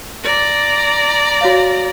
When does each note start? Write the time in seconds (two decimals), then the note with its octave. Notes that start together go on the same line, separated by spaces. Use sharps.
0.23 D5 A#5
1.41 F#4 C#5 F5